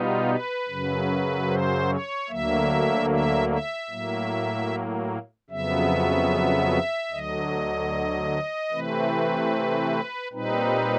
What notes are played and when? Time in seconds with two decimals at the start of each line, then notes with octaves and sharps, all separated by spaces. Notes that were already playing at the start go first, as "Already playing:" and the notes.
Already playing: B2 G3 B3 D#4 F4
0.28 B4
0.68 F#2 C#3 F#3
1.48 C5
1.89 C#5
2.28 D2 D3 F#3 A#3 E5
3.10 E5
3.49 E5
3.90 A2 F#3 A#3
5.50 F2 C#3 F#3 B3 E5
7.11 D2 D3 F#3 D#5
8.71 C3 E3 A3 C4 B4
10.32 A#2 G3 C4 D#4 B4